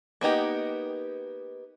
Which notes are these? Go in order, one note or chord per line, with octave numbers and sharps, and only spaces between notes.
A#3 B3 D#4 G4